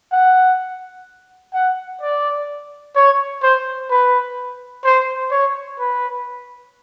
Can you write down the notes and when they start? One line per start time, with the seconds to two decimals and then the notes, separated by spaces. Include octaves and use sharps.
0.12 F#5
1.54 F#5
2.01 D5
2.95 C#5
3.43 C5
3.90 B4
4.85 C5
5.31 C#5
5.79 B4